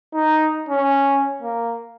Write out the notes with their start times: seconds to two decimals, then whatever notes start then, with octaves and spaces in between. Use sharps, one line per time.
0.14 D#4
0.69 C#4
1.42 A#3